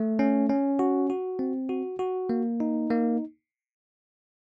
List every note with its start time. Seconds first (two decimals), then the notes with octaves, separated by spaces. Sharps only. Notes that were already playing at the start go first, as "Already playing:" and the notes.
Already playing: A3
0.19 C#4
0.49 C#4
0.79 F#4
1.10 F#4
1.39 C4
1.69 F#4
1.99 F#4
2.29 A#3
2.60 D#4
2.90 A#3